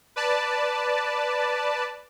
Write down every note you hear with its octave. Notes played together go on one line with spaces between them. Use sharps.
B4 D5 A5